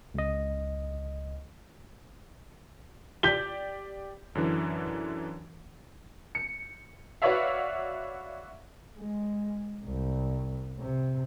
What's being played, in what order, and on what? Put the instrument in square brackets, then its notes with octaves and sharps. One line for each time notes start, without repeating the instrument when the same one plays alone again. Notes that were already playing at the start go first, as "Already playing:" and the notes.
[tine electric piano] C#2 D#5
[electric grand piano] G4 D5 [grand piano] G6 B6 G7
[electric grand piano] F#2 D3 E3
[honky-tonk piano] C#7
F#4 B4 C#5 D5 E5 F5
[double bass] G#3
C2
C3